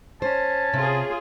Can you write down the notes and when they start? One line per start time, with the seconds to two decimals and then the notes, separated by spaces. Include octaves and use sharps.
0.22 C#4 C5 A5
0.74 C3 F4 G#4